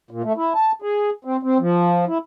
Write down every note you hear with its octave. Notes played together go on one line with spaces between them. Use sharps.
A#2
A3
E4
A5
G#4
C4
C4
F3
E4